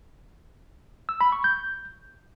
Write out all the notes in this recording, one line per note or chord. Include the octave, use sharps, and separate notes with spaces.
E6
B5
C#6
G6